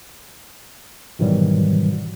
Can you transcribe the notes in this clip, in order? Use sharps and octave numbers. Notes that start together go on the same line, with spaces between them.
G#2 B2 D#3 E3 F#3 G3